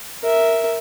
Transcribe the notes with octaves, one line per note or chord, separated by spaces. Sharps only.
A#4 E5